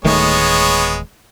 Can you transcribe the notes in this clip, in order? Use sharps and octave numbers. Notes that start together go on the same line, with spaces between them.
D1 D#3 G#3 A3 B3 C#5